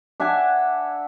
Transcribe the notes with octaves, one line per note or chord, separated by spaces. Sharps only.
D4 E5 F#5 G#5